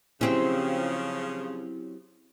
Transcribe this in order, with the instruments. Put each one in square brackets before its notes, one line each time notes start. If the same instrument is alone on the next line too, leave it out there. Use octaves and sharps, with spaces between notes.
[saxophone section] C#3 F3 [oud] F#3 C4 C#4 [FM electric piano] E4 G4